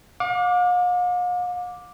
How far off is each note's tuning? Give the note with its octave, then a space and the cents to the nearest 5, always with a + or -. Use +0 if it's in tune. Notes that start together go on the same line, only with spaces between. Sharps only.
F5 +45 D6 +0